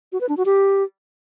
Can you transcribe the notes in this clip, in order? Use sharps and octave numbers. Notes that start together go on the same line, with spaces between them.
F#4
B4
D4
F#4
G4